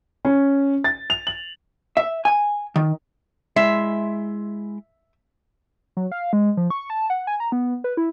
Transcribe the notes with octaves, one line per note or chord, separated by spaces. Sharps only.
C#4
A6
F7
F#7
E5
G#5
D#3
G#3 E4 E5 C6
F#3
F5
G#3
F3
C#6
A5
F#5
G#5
A#5
B3
B4
E4